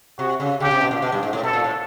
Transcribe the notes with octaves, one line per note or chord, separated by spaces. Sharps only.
C3 F#4
C#3
C#3 G4
C3
B2
A#2
B2
G2
G#2
A2
B2 A4
A#2
A2